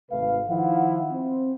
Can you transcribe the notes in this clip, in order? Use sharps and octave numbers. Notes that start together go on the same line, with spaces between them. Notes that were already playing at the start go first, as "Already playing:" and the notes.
G#1 C3 A3 B4 F5
D#3 F3 E4 F5 F#5
C4